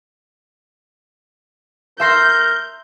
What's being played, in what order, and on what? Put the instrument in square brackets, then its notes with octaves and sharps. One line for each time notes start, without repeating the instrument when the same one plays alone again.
[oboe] A#4 [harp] E5 C6 A#6 [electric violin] G6